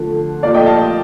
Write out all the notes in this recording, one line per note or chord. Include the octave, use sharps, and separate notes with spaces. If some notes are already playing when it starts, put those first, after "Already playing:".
Already playing: D3 F3 A3
A#2 F3 A3 D5 F5
D#5 G5
F5 A5
D#5